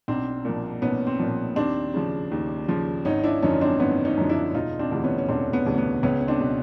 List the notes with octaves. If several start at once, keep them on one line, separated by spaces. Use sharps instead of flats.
B1 C4 D4
A#2 F3
B1 B3 C#4
C4
A#2 F3
D#2 C4 D4
C#3 F3
D#2
C#3 F3
G#1 C#4 D#4
D4 E4
F#2 D3 F3 C#4 D#4
C4 D4
G#1 B3 C#4
C#4 D#4
F#2 D3 F3
D4 E4
E1 D#4 F4
C4 D4
D2 C3 E3
B3 C#4
C#4
E1 C4 D4
B3 C#4
D2 C3 E3
B3
C#2 B3 C#4
C#4
C4 D4
B2